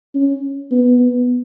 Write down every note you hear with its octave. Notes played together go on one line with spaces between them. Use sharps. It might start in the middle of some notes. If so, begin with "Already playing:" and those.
C#4
B3
B3